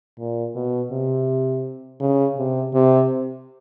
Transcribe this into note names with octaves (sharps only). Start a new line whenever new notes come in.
A#2
B2
C3
C#3
C3
C3